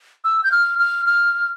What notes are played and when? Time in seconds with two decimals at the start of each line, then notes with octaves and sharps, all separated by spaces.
0.24 E6
0.44 G6
0.52 F6
0.79 F6
1.06 F6